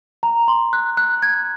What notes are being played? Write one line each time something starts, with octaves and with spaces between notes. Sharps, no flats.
A#5
C6
F#6
F#6
G#6